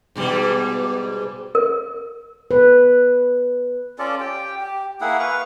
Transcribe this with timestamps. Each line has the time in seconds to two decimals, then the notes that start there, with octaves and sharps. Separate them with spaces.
0.15 G#2 B2 G3
1.55 A#4
2.51 B4
3.99 C#4 F4 A4 D5
4.20 G4 G5
4.61 G4
5.01 A#3 E4 G#4 F#5
5.19 B4 F5 C#6